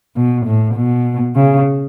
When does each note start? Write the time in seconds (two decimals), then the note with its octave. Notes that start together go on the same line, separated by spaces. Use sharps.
0.16 B2
0.46 A2
0.76 B2
1.36 C#3